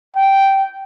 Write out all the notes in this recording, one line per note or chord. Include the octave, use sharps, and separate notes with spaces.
G5